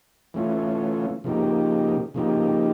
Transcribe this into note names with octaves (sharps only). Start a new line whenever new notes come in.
E3 A3 C#4 F4
C#3 F3 A#3 D#4 G4
C#3 F3 A#3 D#4 G4